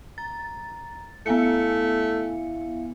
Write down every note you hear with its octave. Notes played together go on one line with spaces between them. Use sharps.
A#5 A6
A3 B3 E4 E5 F5 G#5 C#7